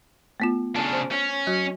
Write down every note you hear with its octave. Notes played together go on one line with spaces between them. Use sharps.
A3 B3 F4
C#3 D4 A5
C5
C#4
F#3 F#4